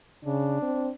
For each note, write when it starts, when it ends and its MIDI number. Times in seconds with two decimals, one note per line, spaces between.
0.25 0.57 49
0.25 0.93 62
0.62 0.90 60